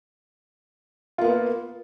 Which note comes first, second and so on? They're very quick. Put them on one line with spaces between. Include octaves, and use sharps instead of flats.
F4 A#3 B3